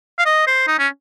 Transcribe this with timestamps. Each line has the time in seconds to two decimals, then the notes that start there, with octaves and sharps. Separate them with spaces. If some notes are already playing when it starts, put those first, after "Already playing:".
0.18 F5
0.25 D#5
0.47 C5
0.67 D#4
0.79 C#4